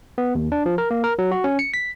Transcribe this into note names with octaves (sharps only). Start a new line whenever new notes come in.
B3
D#2
D4
F3
A#4
A#3
A#4
F#3
F#4
C#4
C#7
B6